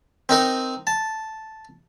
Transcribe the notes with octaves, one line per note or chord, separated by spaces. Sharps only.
C4 D#4 A#4
A5